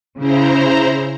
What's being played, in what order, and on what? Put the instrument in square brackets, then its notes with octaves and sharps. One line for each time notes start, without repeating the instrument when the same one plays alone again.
[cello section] C#3 [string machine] E4 C5 A#5